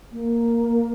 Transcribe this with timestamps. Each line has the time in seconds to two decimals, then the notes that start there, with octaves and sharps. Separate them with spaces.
0.12 A#3